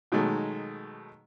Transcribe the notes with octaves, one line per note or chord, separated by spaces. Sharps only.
B2 D#3 F#3 G#3 A3